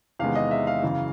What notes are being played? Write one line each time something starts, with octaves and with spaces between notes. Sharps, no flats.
E2 C3 D#3 G#3 B3 F5
D#5
E5
F5
F#2 C#3 E3